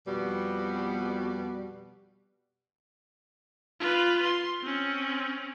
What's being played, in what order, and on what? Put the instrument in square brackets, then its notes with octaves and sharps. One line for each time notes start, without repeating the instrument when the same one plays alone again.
[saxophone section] F2 B2 G3 B3 F#4
[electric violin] F4 B4
C6
C4 C#4